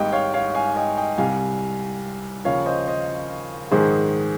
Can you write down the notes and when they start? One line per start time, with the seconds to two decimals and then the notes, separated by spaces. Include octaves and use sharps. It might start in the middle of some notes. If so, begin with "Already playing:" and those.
Already playing: G#1 G#2 G3 D#5 G5
0.12 C#5 F5
0.34 C#5 F5
0.55 F5 G#5
0.76 D#5 G5
0.97 D#5 G5
1.18 C2 C3 G3 F5 G#5
2.45 D#2 C#3 F3 C#5 F5
2.66 C5 D#5
2.87 C5 D#5
3.71 A#1 G#2 D#3 G#3 G#4 C5